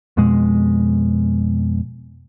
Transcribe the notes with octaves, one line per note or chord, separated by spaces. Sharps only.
F2 B2 G#3